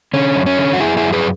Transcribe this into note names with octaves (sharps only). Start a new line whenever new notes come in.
D3 C#4
F#2
C#4
D3
F#4
F#2 E4 G#4
E4 G#4
F#2
G#4 B4